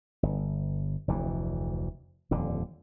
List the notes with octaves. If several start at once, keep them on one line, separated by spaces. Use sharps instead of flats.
G1
F1 D2 E3
D#1 F2 D3